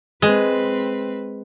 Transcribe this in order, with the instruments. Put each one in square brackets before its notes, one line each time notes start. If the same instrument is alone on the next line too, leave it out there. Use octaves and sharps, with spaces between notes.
[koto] G#3 [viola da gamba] C4 B4